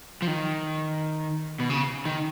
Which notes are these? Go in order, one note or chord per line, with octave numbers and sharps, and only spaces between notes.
F3
D#3
B2
C#3
D#3